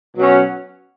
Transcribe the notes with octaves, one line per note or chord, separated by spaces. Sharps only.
B2 F#3 C#4 F#4